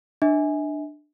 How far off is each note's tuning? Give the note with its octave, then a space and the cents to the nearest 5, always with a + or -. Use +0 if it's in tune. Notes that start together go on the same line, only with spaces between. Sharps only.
D4 +20 E5 -40 G#5 +0